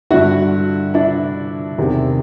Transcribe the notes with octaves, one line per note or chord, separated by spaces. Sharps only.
G2 D3 E4 F#4
D4 E4
E2 C3 D#3